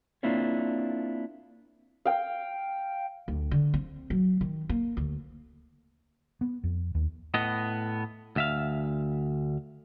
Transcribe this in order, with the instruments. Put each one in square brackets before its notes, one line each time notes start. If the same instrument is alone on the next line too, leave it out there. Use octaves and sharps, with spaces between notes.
[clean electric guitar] A#3 C4 D4 E4 F4 C#5
[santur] F5 G5
[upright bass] D2
D3
C4
F#3
D#3
A#3
D2
[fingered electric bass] B3
F2
D#2
[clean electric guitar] A2 B3 D#5
D2 E5 F5